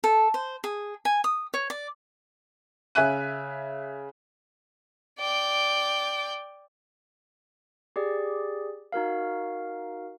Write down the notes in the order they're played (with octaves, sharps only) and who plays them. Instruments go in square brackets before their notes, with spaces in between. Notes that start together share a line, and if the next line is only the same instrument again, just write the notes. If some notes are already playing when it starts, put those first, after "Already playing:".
[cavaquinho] A4
C5
G#4
G#5
D#6
C#5
D5
[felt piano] C#3 E5 G#5 F#6 D#7
[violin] D5 G5
[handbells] G4 G#4 D5
D#4 F#4 A#4 F5